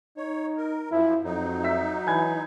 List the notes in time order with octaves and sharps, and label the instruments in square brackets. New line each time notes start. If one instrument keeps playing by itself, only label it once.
[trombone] D#4 [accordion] C#5
[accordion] A#4
[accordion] F#2 F3 [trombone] E4
[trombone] F2 [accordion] F#3 D#4
[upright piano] E5 E6 B6
[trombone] E3 [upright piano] G#5 B5 G#6